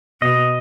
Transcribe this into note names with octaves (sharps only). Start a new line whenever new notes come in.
B2 D#5